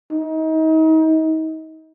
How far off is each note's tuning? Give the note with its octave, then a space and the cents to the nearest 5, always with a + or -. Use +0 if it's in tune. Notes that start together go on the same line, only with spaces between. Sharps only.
D#4 +35